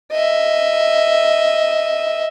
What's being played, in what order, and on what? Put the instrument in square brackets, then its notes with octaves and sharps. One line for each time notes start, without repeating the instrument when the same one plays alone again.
[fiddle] D#5 E5